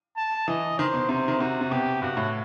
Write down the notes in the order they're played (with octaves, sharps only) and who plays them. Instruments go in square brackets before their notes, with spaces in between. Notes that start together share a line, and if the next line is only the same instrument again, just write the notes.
[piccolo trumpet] A5
[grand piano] E3 [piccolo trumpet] D#5
[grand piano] D#3 [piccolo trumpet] C5
[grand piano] B2
[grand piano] C3 [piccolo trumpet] C5
[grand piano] D#3
[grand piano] C3 [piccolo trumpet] F#4
[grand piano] C3
[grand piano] B2 [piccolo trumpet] G4
[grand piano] G2 [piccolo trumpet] F#4
[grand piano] A2